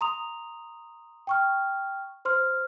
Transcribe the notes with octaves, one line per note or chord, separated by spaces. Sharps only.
A#5 C6 D#6 F7
G5 C#6 F6
C5 C6 F6